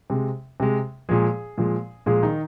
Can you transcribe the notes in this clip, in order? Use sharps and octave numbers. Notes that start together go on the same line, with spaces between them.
C3 G#3
C3 G#3
A#2 F3 G#3 G#4
A#2 F3 G#3
A#2 F3 G#3 G#4
D#3 D#4